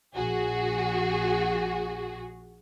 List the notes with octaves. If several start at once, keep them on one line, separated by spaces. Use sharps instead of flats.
A#1 F#4 G#4